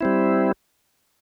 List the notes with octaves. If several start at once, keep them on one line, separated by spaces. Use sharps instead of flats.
G3 C4 E4